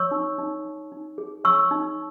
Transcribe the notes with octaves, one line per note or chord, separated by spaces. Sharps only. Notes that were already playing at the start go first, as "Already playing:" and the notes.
Already playing: C#5 C#6 E6
D#4
D#4
D#4
D#4
G#4
C#5 C#6 E6
D#4